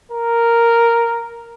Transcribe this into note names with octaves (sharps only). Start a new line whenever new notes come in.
A#4